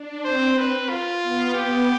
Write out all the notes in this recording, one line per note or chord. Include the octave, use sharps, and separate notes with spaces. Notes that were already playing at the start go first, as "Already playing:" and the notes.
Already playing: D4
C4 C5
B4
F4
B3
G4